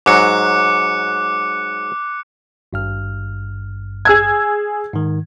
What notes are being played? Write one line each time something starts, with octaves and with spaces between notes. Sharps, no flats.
G#2 F#3 D6 F#6 C#7
G#1 G2 F6
G#4 E6 G#6
G#2 D#3